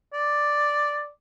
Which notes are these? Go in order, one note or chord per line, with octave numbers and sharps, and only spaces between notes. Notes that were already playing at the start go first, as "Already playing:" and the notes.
D5